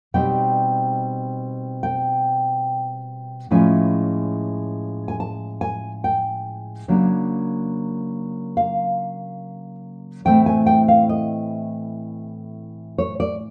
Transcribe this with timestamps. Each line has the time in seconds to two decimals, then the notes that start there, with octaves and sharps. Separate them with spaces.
0.14 B2 G3 C4 D#4 G5
1.83 G5
3.51 A2 F3 G#3 C#4 E4 G#5
5.08 G#5
5.20 A5
5.61 G#5
6.04 G5
6.88 C#3 F#3 A#3 D4
8.57 F5
10.25 A2 E3 A3 C4 E4 G5
10.46 G#5
10.66 G5
10.88 F5
11.09 D#5
12.98 C#5
13.20 D5